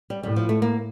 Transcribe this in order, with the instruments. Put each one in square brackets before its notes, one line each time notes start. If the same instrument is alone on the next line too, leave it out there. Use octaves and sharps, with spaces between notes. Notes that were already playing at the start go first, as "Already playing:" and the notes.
[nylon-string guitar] G3
[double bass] A2 [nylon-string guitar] G3
[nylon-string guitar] F3
A3
A#3